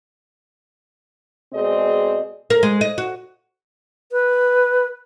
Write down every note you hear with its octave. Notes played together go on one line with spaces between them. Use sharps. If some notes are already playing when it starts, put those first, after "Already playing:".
B2 G#3 C4 G#4 D5 D#5
A#4
G#3
D#5
F#4
B4